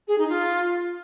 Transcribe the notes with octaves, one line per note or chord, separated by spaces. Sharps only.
G#4
D#4
F4